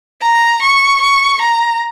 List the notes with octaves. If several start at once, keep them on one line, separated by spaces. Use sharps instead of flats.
A#5
C#6
C#6
A#5